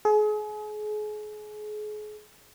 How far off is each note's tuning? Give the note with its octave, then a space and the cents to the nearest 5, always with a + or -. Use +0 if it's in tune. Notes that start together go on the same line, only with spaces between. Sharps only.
G#4 +35